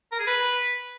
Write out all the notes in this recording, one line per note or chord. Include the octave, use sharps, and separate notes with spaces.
A#4
G#4
B4